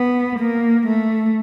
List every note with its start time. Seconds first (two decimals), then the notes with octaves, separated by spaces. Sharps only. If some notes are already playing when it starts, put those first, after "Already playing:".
Already playing: B3
0.39 A#3
0.87 A3